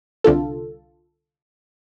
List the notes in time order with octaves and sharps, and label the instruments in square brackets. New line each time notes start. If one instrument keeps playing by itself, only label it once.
[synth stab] C2 D3 F4 A4